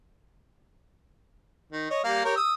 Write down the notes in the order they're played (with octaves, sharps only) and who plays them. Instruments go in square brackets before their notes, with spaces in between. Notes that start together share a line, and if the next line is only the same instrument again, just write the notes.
[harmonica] D#3
C#5 D#5
G3 A#3 F5
G4 A#4 C#5
D#6 E6